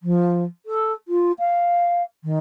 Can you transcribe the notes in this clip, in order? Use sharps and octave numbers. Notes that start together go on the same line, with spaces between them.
F3
A4
F4
F5
D#3